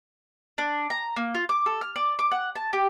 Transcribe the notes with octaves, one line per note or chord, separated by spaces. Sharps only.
D4
A#5
A#3
F4
D6
A4
F6
D5
D6
F#5
A5
G4